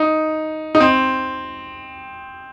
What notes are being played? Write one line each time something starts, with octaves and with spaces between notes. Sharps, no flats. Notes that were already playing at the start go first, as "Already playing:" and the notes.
Already playing: D#4
D#4
C4